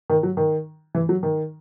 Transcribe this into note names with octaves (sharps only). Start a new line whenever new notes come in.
D#3
F#3
D#3
E3
F#3
D#3